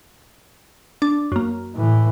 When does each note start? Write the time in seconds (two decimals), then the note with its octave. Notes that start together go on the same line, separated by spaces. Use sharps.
1.02 D4
1.32 F#2 A#3
1.76 A2 E3